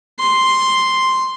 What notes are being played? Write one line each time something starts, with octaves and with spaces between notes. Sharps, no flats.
C6